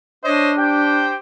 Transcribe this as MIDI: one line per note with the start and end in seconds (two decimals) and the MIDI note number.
0.24 1.13 62
0.24 0.53 72
0.24 0.53 73
0.24 0.53 75
0.58 1.18 67
0.58 1.18 72
0.58 1.18 79